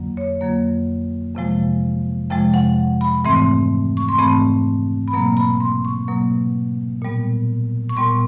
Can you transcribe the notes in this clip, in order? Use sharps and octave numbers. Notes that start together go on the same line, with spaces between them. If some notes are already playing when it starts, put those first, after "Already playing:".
Already playing: F2 D3 F#3 A#3
C#5
F2 D3 F#3 A#3
F2 C3 F3 G#3
F2 C3 F3 G#3 G5
F#5
B5
G#2 E3 A3 C4 C6
C#6
C6
G#2 E3 A3 C4 B5
B5
B2 F#3 A#3 A#5
B5
C6
C#6
B2 F#3 A#3
A#2 G3 B3
C#6
A#2 G3 B3 C6